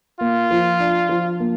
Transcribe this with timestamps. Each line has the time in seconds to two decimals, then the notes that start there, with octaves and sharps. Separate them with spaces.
0.20 A#3 F4
0.51 F3
0.80 D4
1.09 F3
1.40 A#3